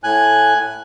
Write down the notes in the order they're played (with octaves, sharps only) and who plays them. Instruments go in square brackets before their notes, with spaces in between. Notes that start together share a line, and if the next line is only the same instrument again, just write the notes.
[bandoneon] A2 G#5 F#6